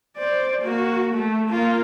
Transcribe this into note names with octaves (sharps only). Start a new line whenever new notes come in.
C5 D5
A#3 F#4
A3
A#3 F4